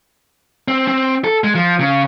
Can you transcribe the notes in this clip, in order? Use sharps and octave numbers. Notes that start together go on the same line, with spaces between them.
C4
C4
A4
G#3
F3
C#3